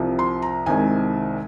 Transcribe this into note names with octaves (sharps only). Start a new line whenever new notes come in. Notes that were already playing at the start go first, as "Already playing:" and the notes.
Already playing: C2 C3 F3
C6
A#5
C2 C3 D#3 G#3 G#5